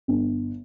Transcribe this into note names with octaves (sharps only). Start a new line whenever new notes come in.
G1